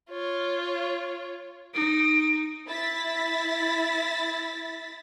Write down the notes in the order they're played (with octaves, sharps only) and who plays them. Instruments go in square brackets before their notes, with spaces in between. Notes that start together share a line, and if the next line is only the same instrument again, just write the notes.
[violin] F4 C#5
[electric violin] D#4 [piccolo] D7
[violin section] E4 A6 B6